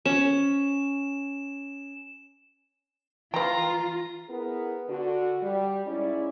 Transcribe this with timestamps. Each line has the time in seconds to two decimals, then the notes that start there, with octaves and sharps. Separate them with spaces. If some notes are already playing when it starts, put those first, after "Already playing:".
0.06 C#4 E7
3.34 E3 F4 B4 G5 A#5
4.28 B3 E4 G#4 A#4 B4
4.89 D3 F#4
5.41 G3
5.87 G#2 C#4 E4 D5